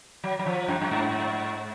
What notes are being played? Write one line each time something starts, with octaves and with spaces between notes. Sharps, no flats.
F#3
F#3
F3
F#2
F#2
G#2